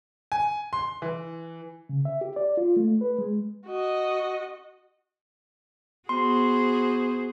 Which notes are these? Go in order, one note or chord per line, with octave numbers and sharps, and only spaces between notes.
G#5
C6
E3
C#3
E5
G4
D5
F4
A3
B4
G#3
F#4 D#5
B3 F#4 G#4 C5 C6